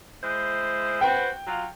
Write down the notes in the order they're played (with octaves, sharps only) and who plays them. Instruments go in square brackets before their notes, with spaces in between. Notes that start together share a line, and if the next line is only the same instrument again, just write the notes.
[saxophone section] G#3 E4 C5
[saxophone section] F#4 B4 C5 [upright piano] G5
[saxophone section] F#3 F4